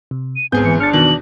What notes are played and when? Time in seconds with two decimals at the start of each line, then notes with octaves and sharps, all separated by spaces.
0.11 C3
0.36 D#7
0.52 G1 G#2 B3 C4 G#4 G#5 G6
0.65 E3 C#7
0.80 D4 F6 A6 C#7
0.93 E2 B2 D#3 F#7